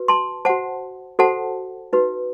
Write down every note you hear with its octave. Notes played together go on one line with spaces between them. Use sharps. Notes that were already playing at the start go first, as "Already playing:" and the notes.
Already playing: F#4 B4
A5 C6
F#4 C5 F#5 A5
F#4 A4 C5 F#5 A5
D#4 F#4 B4